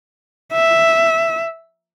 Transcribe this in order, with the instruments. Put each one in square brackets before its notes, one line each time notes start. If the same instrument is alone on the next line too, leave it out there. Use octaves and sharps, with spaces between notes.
[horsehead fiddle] E5